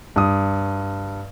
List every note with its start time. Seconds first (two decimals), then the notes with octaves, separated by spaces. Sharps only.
0.16 G2 D#6